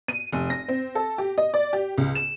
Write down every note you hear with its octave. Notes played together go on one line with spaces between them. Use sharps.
D#7
F1
A#6
C4
A4
G4
D#5
D5
G4
C#2
E7